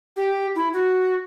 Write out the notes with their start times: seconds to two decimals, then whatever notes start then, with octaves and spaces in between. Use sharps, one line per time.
0.16 G4
0.55 E4
0.74 F#4